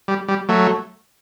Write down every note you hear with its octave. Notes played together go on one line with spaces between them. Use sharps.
G3
G3
F#3 A3